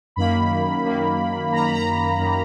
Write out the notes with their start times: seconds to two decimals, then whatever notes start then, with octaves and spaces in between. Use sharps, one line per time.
0.16 F#2 D#3 A#3 B5
0.84 F#2 D#3 A#3
1.52 F#2 D#3 A#3 A#5
1.63 B5
1.74 A#5
2.19 F#2 D#3 A#3